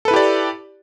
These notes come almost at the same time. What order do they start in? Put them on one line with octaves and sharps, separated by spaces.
A4 B4 E4 G4 D5